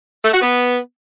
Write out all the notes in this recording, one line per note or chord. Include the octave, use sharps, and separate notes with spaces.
A3
F#4
B3